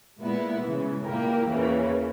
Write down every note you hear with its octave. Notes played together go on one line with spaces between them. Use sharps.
A#2 G#3 B3 E4
C#3 E3 G#3
A#2 A#3 E4 G4 A#4
E2 C#3 E3 A#3 C#4